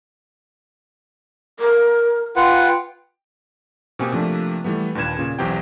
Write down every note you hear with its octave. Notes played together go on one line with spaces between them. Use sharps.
A#4
F4 B4 F#5 G5
B2 A#3 C4 G4 G#5
C3 F3 A3 A#3 D4
E3 G3 A3 B3
D#2 A#2 D4 B4 G#6 E7
A#2 C#3
B1 E2 B3 C4 G4 G5